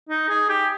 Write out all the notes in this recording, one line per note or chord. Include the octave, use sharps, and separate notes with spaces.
D#4
G#4
G4